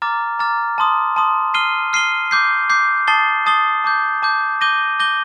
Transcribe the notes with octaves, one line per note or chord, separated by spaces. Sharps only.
A#5 D6 F6 A6
A#5 D6 F6 A6
A5 C6 D#6
A5 C6 D#6
F6 C7 D#7 G7
F6 C7 D#7 G7
D6 G6 C7
D6 G6 C7
A5 D#6 A6 C7 G7
A5 D#6 A6 C7 G7
A5 D6 G6
A5 D6 G6
D6 G6 A#6 D#7 G7
D6 G6 A#6 D#7 G7